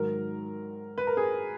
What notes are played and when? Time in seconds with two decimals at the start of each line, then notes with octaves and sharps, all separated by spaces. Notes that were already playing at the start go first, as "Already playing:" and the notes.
Already playing: G#2 D#3 F#3 A#4
0.98 B4
1.07 A#4
1.17 G#4